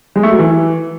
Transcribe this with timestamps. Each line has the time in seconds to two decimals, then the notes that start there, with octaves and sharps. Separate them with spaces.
0.16 G#3
0.23 A3
0.31 F#3
0.39 E3